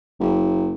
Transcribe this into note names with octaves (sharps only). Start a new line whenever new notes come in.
F#1